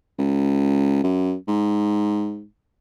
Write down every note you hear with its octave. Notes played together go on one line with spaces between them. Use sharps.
C#2
F#2
G#2